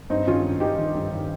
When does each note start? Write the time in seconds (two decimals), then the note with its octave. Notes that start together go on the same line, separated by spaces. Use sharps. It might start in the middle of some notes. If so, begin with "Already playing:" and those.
0.10 G2 C4 D#4
0.27 D#3 C#4 F4
0.43 G2
0.60 D#3 D#4 G4
0.78 D#3
0.95 G2
1.11 D#3